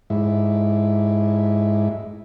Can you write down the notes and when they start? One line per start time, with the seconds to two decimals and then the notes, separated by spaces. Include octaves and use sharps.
0.10 G#2 E4